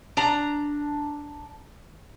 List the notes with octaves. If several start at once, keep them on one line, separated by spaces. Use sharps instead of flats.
D4 A#5